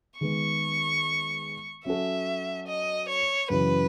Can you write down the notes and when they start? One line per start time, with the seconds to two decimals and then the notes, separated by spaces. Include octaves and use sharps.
0.20 D#3 G#3 B3 C#6
1.85 F#3 C#4 F#4 A4 E5
2.67 D#5
3.08 C#5
3.50 F#2 C#3 E3 B4